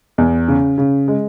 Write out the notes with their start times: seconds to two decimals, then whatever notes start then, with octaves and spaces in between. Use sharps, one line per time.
0.18 E2
0.48 C#3
0.78 C#3
1.08 G#3